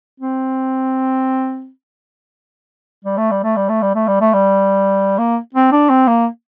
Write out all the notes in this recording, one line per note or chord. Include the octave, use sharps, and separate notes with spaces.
C4
G3
A3
G3
A3
G3
A3
G3
A3
G3
A3
G3
A#3
C4
D4
C4
A#3